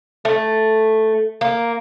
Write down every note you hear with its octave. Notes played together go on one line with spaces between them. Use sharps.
A3
A#3